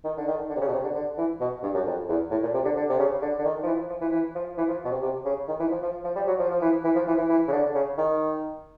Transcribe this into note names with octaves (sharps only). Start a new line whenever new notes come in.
D#3
D3
D#3
D3
C3
C#3
B2
C3
D3
D3
E3
B2
G2
F#2
F2
E2
A2
A#2
C3
D3
D3
C3
C#3
D3
D3
D#3
F3
E3
F3
E3
E3
F3
E3
F3
B2
C3
C3
C#3
D#3
E3
F3
F3
F3
G3
F#3
F3
F3
E3
E3
F3
E3
E3
E3
C#3
D3
C#3
D#3